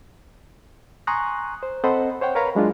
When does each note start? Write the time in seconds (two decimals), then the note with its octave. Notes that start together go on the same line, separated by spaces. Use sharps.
1.07 G#5 A#5 C6 C#6 D#6 F#6
1.63 C5
1.84 C4 A4 C5 D#5 F#5 B5
2.21 C5 C#5 F#5 G5
2.35 A#4 B4 C#5 F5 A#5 B5
2.55 F#3 G#3 D4 F4